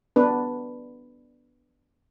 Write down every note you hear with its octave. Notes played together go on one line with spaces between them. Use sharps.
B3 D4 B4